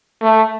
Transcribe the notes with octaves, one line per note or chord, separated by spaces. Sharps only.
A3